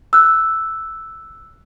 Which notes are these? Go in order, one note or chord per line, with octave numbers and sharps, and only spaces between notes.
E6 F#6